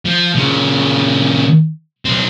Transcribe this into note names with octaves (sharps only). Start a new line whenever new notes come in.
F3
A#2 C#3
B1 C4